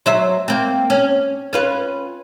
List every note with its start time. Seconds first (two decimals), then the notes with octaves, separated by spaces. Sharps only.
0.06 F#3 C5 E5
0.48 A#3 C4
0.90 C#4
1.53 C#4 F4 B4